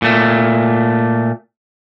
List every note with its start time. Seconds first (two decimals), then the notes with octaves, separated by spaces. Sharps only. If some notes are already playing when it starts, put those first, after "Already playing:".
0.02 A#2 A3